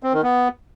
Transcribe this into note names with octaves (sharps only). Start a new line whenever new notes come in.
C4
D#3
B3